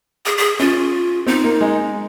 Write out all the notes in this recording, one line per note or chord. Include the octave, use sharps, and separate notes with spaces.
G#4
G#4
C#4 F4
C4 D#4
A#3
G#3